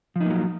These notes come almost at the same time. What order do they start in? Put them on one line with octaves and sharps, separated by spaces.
F3 D#4 A#3 F#3